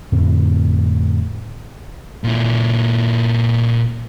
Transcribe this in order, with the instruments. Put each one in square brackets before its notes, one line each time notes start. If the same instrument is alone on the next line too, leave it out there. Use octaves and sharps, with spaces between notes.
[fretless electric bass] F2 A2 D3 C4
[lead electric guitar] A#2 E4